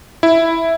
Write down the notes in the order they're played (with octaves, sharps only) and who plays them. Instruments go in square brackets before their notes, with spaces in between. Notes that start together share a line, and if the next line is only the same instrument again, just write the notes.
[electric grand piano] E4